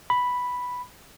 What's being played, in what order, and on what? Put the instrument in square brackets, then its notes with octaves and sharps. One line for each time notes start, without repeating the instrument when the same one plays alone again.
[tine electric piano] B5